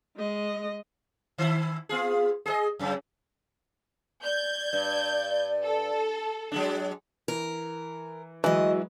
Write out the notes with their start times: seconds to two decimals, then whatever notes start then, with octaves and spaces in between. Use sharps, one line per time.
0.17 G#3 D#5
1.38 D#3 E4
1.89 B3 F4 G#4
2.46 G#4 A#4 D#5
2.79 F#2 C#3
4.23 D5 G6 G#6
4.73 G2
5.65 A4
6.52 F#3 G#3 D4
7.28 E3 A#4
8.44 D2 E3 F#3 G#3 F#4 D#5